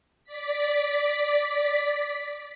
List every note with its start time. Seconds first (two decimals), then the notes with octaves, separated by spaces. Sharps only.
0.24 D5 B6